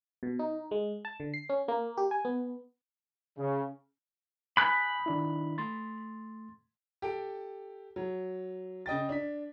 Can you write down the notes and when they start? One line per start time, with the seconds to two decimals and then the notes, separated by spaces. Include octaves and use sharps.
0.23 B2
0.39 D#4
0.71 G#3
1.05 A5
1.20 D3
1.34 C7
1.49 C#4
1.68 A#3
1.97 G4
2.11 G#5
2.25 B3
3.38 C#3
4.57 G#5 B5 D#6 F#6 G6
5.06 D#3 D4 E4
5.58 A3 C6 A6
7.02 G4 A4 D7
7.96 F#3
8.86 C#3 D#5 G5 A6
9.09 D4 B6